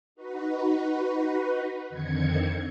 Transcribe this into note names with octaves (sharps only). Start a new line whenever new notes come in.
D#4 F#4 B4
F2 D3 D#3 C4 G#6 C#7